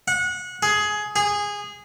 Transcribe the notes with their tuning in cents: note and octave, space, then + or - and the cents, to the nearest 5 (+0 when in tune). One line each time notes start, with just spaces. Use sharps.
F#5 -25
G#4 +15
G#4 -15